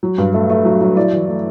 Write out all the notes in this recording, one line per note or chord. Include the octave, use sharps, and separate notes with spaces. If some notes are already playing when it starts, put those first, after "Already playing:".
F#3
G2
A3
A3
F#3
F#3
E4 D5
E3
A3